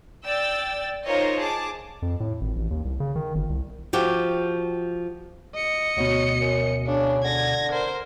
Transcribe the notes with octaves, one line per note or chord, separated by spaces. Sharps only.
D5 G5 E6 A6
D#4 F4 A#4 C5 C#5 D#5
G#4 A5 D6
F2
A2
G#1
A1
D#2
C2
C#3
D#3
G1
C2
F3 F#4 G4
D#5 C#7
D2 B2 F#3
F#2
C#3 D4
D3 G#6 A#6
A#4 C5